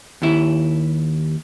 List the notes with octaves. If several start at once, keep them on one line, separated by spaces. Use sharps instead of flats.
D#2 E4